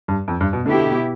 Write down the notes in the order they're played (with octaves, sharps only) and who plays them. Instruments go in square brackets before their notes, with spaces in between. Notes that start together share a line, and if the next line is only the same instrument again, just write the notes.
[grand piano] G2
F2
G2
B2
[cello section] B2 B3 E4 G4 [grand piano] D3